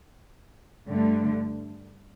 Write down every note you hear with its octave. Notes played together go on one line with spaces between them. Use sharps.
G2 D3 A3